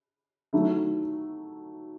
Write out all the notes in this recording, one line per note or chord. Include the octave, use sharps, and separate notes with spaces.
D#3 F#3 A3 E4